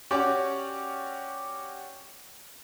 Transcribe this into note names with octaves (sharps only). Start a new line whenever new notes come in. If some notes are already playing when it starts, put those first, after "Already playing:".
C#4 F#4 G4 C#5 D5